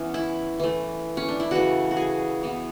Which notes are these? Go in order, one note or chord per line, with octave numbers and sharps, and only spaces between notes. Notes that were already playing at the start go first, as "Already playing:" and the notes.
Already playing: E3 B3 C#4
E4
E3 A3
C#4
D4
E4
C#3 E3 A3 F#4
F#4
G#4
E3 B3